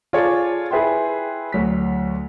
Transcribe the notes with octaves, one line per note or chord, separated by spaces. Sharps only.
F4 G#4 A4 C#5 D5
E4 G#4 B4 E5 G5 C6
D2 F#3 B6